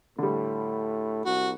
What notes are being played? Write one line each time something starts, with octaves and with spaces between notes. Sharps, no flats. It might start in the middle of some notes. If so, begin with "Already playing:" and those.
A2 D3 G3
C2 F#4